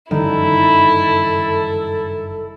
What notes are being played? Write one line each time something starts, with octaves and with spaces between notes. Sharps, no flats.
F#1 G2 D#3 E4 A4